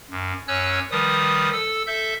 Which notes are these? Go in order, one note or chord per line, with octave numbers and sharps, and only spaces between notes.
F#2
F#2 C#4 C#5 E6 F#6
D#3 F3 G3 B4 D#6
A4 E6
A4 E5 G6